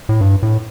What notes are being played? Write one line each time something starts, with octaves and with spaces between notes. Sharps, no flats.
A2
G2
A2